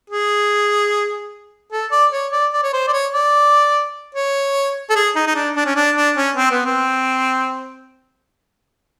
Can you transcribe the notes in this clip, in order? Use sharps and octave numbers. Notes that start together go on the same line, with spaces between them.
G#4
A4
D5
C#5
D5
D5
C#5
C5
D5
C#5
D5
C#5
A4
G#4
D#4
D#4
D4
D4
C#4
D4
D4
C#4
C4
B3
C4